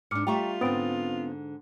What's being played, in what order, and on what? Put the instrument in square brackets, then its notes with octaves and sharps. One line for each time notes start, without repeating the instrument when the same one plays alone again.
[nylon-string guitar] G#2 D4 [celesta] D6 F6 C#7
[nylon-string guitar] G3 A3 E5 [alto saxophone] F4 [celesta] G5 A#5 C#6
[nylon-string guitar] G#2 D3 [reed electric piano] B3 C4 [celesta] D#6 A6 D7